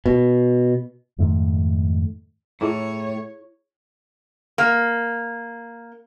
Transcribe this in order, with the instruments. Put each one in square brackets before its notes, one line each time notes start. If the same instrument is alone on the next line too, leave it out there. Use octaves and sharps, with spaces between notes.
[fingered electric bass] B2
F2 G#2 D#3 A3
[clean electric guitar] A2 [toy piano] E4 G#4 A#5 [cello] C#5
[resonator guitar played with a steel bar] A#3